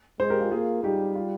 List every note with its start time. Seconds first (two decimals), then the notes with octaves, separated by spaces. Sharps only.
0.19 G#3 G#4 C5
0.30 G4 A#4
0.41 F4 G#4
0.51 A#3 F4 G#4
0.83 G3 D#4 G4
1.15 F4